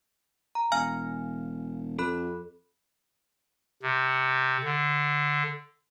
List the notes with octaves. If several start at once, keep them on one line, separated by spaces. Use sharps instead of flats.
A#5
E1 F5 G#5 F6
F2 A4 B5 F#6
C3
D3